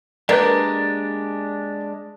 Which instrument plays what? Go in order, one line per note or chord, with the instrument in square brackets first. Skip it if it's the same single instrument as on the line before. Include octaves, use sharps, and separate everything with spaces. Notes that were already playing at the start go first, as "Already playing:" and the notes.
[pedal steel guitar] G#3 D4 G4 [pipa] A#3 [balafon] A#4 B4 D5